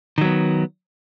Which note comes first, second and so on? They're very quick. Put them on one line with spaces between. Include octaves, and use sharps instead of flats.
D#3 F#3 B3